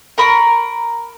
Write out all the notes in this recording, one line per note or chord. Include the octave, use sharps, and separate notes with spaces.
A#4 B5 C#6